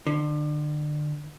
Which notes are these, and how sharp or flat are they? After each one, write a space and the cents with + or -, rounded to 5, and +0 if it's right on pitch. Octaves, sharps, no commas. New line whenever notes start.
D3 +30